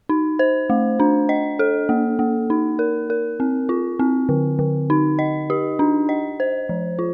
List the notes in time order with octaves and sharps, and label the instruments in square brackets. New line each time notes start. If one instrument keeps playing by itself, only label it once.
[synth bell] D#4
C5
A3
D4
D#5
A4
A#3
A#3
D#4
A#4
A#4
C4
F4
C4
D3
D3
D#4
D#5
G4
D4
D#5
C5
F3
F4